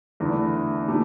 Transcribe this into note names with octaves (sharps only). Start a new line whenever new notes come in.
E2 D3 A3 E4
A#2 A3 E4 G4